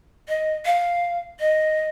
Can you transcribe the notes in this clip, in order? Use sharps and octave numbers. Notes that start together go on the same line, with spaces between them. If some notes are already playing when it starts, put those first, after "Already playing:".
D#5
F5
D#5